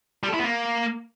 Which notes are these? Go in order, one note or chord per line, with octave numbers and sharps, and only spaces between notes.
G3
A4
E4
B3
A#3